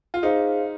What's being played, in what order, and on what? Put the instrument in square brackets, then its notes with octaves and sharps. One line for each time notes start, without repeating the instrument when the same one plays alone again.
[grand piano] F4
[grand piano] D#4 [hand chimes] G#4 C5 F5